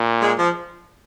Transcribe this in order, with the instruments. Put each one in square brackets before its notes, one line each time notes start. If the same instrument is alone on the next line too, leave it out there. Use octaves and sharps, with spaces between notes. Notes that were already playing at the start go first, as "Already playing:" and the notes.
Already playing: [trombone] A#2
[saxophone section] G#3
F3